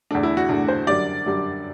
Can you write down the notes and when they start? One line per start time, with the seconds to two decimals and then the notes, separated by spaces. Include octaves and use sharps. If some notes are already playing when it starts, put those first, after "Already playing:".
0.11 E2 D3 A3 D4
0.23 E4
0.37 F#4
0.49 E2 D3 A3 D4
0.68 C5
0.87 F#2 D3 G3 D5
1.26 F#2 D3 G3